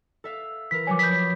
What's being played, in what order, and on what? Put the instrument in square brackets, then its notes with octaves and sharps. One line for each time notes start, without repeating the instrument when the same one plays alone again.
[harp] A4 E5 F5
[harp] E3 A#4 [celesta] B6
[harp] F3 F#3 C#5 [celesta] G#5 D6
[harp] C#5 B5 D#6 [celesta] G6 B6